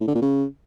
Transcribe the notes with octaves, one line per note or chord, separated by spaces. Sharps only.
A2
D3
A#2
C#3